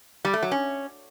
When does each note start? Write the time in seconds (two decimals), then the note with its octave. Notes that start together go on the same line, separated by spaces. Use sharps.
0.25 G3
0.34 A3
0.43 F#3
0.51 C#4